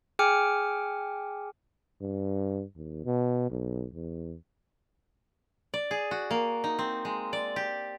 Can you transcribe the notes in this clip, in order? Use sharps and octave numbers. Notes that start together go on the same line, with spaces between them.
G#4 G5 G#5 D6 F6 C#7
G2
D#2
B2
B1
E2
D5
G#4
F#4
A#3
D#4
C4
G#3
D5
G4